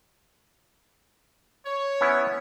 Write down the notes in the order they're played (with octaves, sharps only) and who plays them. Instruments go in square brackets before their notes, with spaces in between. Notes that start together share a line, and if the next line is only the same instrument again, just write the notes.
[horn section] C#5
[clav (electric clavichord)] B3 C#4 E4